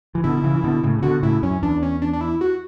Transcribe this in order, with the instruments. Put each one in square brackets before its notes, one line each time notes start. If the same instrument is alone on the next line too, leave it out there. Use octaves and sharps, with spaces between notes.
[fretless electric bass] E3
[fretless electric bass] B2 D3 [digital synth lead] E4
[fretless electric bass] D3
C#3 E3
E3
B2 D3
A2 C#3
C#3
[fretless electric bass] B2 D3 [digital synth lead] F#4
[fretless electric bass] A2 C#3 [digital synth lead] E4
[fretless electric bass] F#2 [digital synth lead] C#4
[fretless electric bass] E2 [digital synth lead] D4
[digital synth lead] C#4
D4
D4
E4
F#4